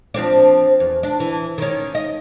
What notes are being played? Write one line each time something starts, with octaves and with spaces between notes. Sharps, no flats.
F3 C4 D4
E2
D4
E3
D#3 C#4
D#5